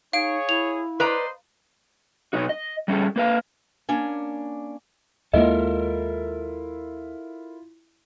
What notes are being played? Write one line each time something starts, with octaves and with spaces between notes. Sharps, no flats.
D#4 G#4 C#5 F5 D7
E4 F7
B4 C5 D5 D#5 A#5 C6
B2 F#3 G3 B3 D#4 F#4
D#5
G3 C#4 G#4 A4
A#3 B4 F5
A#3 C#4 D4
D#2 G#3 A#3 E4 F4 A4 A#4 D#5